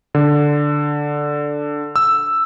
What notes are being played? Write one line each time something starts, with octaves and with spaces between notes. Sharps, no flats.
D3
E6